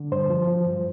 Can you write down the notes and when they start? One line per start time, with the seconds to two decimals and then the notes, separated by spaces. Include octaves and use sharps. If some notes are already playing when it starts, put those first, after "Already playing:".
Already playing: D3
0.12 G2 C5
0.30 F3
0.47 F3
0.66 G2